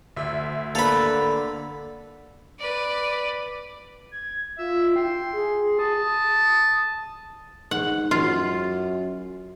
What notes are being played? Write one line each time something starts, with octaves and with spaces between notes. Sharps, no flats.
D2 E5
D3 A#3 A4 B4 F7
B4 D5
G#6
F4 E5
G5 C6
G#4
A5 D#6
G#2 F#5
F#2 F4